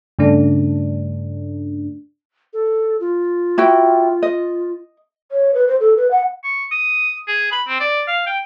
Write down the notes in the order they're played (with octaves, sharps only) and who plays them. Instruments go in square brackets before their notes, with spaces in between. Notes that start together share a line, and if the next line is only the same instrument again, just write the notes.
[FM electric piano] G2 C#3 A3 D4
[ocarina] A4
F4
[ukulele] E4 F#4 G5
D#5
[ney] C#5
B4
C5
A4
B4
F#5
[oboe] C#6
D#6
G#4
B5
C4
D5
F5
G5